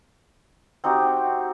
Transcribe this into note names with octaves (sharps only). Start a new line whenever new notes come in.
C4 D#4 F#4 G4